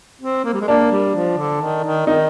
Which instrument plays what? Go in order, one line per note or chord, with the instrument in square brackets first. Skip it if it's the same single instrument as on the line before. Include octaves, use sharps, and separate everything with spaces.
[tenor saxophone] C4
A#3
G3
G#3
[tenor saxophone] A#3 [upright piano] D4
[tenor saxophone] G3
F3
D3
D#3
D#3
[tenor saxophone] D#3 [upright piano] D#4